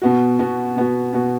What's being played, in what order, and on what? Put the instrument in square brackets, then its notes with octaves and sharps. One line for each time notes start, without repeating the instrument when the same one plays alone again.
[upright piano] B2 B3 F#4
B2 B3 F#4
B2 B3 F#4
B2 B3 F#4